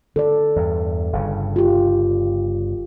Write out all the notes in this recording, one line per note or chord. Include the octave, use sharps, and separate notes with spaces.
D3 A4 D5
E2 G2
G1 G2 C#3
F4 G4